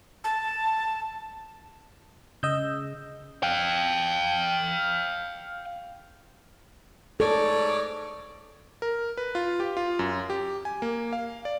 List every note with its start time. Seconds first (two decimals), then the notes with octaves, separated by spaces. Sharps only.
0.24 A5
2.43 C#3 D#5 E6 G6
3.43 F5 G5
7.20 G#2 A4 C#5 D5
8.82 A#4
9.17 B4
9.35 F4
9.60 G4
9.77 F4
9.99 F#2
10.30 G4
10.65 G#5
10.82 A#3
11.13 F5
11.45 D5